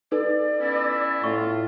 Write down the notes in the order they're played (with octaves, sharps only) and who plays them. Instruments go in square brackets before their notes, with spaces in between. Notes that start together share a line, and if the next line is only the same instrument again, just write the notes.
[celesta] D#4 A4 B4 [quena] D5
[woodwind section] B3 C#4 E4
[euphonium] A2 [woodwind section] F4 [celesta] C#6